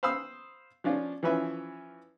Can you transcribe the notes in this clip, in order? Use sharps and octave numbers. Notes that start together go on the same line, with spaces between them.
C5 F5 B5 D#6 E6
F3 C#4 D4 F4
E3 F3 C#4 B4 E5